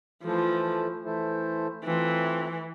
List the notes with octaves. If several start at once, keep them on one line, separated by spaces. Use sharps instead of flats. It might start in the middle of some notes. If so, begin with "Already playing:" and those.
E3 F3 A3 E4 A4 C5
E3 A3 E4 A4 C5
E3 A3 C4 F4